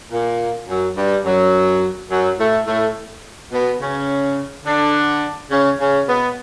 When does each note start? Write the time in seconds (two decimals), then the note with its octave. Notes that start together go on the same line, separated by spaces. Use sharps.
0.10 A#2 A#3
0.67 F#2 F#3
0.95 G2 G3
1.24 F#2 F#3
2.10 F#2 F#3
2.38 A2 A3
2.66 A2 A3
3.51 B2 B3
3.80 C#3 C#4
4.65 D3 D4
5.50 C#3 C#4
5.78 C#3 C#4
6.07 B2 B3